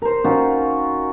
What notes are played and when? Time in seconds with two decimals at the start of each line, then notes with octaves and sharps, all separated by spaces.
0.02 A#4 C5
0.24 C#4 D#4 F4 F#4